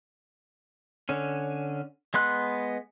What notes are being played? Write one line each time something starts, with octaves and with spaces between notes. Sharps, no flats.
D3 C#4
G#3 B3 C6 F#6